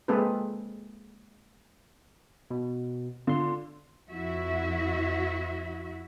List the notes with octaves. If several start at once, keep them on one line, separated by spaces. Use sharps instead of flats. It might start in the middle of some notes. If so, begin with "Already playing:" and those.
G#3 A#3 C4 G#4 A4 B4
B2
D3 F4 C6
F2 E4 F#4 E5